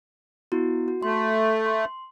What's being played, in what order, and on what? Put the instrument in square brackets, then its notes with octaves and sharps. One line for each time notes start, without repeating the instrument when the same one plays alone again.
[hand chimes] B3 E4 F#4
F#4
[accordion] A3 [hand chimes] C6
[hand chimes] C6